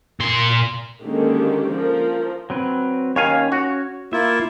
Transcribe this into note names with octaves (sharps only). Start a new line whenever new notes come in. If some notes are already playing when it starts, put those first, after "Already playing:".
A#2 C6
D3 D#3 G#3 A#3 C#4 G4
F3 A#4
F#3 C4 B4
D#2 C#4 C#5 F5 G#5
F#4
A#3 E4 F4 E5